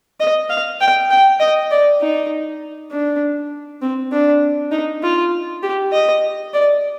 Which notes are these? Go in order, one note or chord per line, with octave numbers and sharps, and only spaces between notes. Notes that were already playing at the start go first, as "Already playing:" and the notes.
D#5
F5
G5
G5
D#5
D5
D#4
D4
C4
D4
D#4
F4
G4
D#5
D5